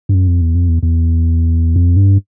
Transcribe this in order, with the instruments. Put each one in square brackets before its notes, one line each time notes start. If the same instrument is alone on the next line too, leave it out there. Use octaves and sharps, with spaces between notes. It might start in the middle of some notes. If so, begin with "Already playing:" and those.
[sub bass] G2
F#2
F2
E2
F2
E2
E2
F2
G2